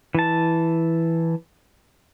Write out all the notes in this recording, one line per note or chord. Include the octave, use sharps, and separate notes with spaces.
E3 A5